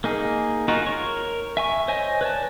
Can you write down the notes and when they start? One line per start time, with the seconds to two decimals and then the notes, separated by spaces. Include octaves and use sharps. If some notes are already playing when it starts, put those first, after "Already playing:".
0.04 A#3 D#4 G#4
0.68 D#4 F4 F#4 A#4
0.87 A#4 C#5
1.57 E5 G#5 C#6
1.88 C5 C#5 D#5 G#5
2.21 B4 C#5 D5 A5